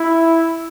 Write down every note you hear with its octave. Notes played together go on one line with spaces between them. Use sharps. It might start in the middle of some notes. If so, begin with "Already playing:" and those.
Already playing: E4